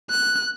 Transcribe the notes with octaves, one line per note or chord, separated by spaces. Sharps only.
F#6